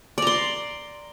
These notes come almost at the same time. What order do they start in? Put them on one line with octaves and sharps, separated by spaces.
D5 A#5 C6